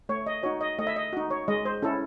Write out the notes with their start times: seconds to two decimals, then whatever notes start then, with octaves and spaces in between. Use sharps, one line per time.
0.09 A3 C#5
0.26 D#5
0.43 D#4 F#4 C#5
0.61 D#5
0.78 A3 D#5
0.87 E5
0.96 D#5
1.13 D#4 F#4
1.31 C#5
1.48 G#3 D#5
1.65 C5
1.82 C#4 E4 A4